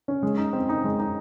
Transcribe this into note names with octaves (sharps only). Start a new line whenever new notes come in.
C#4
G#3
D#4
C4
D#4
G#3
D#4